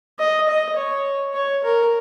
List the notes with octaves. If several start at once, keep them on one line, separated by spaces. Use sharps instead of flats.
D#5
D#5
C#5
C#5
A#4